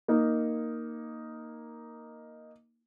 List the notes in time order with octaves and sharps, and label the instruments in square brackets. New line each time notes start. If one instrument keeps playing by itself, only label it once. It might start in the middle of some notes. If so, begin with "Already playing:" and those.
[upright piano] A#3 D#4